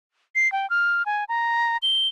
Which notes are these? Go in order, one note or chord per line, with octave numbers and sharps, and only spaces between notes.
C7
G5
F6
G#5
A#5
G7